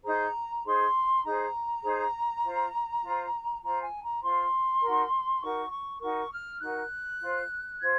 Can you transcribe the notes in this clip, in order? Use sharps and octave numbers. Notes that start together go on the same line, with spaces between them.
D#4 G#4 C5 A#5
D#4 G#4 C5 C6
D#4 G#4 C5 A#5
D#4 G#4 C5
F4 C5
F4 C5
F4 C5 A#5
G#5
A#5
F4 C5 C6
D#4 F#4 A#4
D#4 F#4 A#4 C#6
C#6
D#4 F#4 A#4 C#6
F6
D#4 F#4 A#4 F#6
F4 C5
F4 C5 G#6